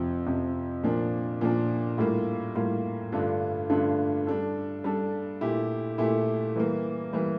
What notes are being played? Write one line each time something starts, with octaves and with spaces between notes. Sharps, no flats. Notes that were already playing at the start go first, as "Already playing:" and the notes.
Already playing: F2 C3 F3
F2 C3 F3
A#2 F3 A#3 D4
A#2 F3 A#3 D4
A2 G3 A#3 F4
A2 G3 A#3 F4
G2 D3 A3 D4 F4
G2 D3 A3 D4 F4
G3 D4 A4
G3 D4 A4
A#2 A3 E4 G4
A#2 A3 E4 G4
E3 G3 A#3
E3 G3 A#3